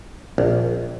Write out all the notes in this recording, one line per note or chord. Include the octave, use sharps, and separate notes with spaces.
A#1